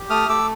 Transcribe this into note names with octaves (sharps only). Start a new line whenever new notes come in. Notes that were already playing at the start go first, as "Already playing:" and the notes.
Already playing: G4
A3 D#6 F6
A3 D6 E6